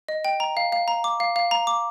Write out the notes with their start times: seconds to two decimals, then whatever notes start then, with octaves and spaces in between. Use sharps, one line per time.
0.08 D#5
0.25 G5
0.40 A#5
0.57 F5
0.72 F5
0.88 A#5
1.04 D6
1.20 F5
1.36 F5
1.51 A#5
1.67 D6